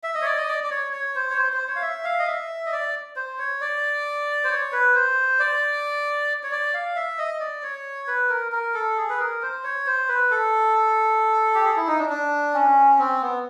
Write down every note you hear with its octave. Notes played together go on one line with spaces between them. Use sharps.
E5
D#5
C#5
D5
D#5
D5
D5
C#5
C#5
C5
C#5
C5
C5
C#5
F5
E5
F5
D#5
E5
D#5
D5
C5
C#5
D5
C5
C#5
B4
C5
D5
C#5
D5
F5
E5
D#5
D5
C#5
B4
A#4
A#4
A4
G#4
B4
A#4
C5
C#5
C5
B4
A4
G4
G#4
E4
D#4
D4
D4
C#4
C4
B3